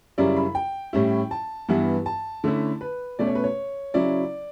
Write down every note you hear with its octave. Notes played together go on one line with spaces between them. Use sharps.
F#2 C#3 G3 C#4 E4 D5
B5
G5
A2 G3 C#4 E4
A5
G2 E3 G3 B3 E4
A5
D3 A3 C#4 E4
B4
B2 A3 C#4 D5
C#5
B4
C#5
C#3 F#3 C#4 E4 D5